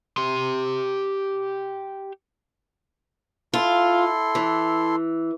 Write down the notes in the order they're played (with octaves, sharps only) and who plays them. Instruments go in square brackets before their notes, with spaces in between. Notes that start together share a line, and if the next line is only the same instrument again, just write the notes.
[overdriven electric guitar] G4 C6
[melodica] E4 A4 C6 [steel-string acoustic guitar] F4
[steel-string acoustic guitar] E3